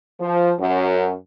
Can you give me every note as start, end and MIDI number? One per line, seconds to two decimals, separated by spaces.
0.20 0.51 53
0.59 1.12 42